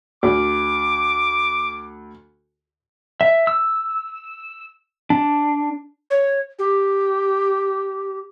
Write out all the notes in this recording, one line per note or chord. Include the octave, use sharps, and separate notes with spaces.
D2 D6
E5
E6
D4
C#5
G4